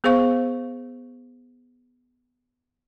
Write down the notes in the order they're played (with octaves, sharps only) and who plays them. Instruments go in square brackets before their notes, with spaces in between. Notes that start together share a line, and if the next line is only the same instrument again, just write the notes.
[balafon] B3 G#4 C5 F5 C#6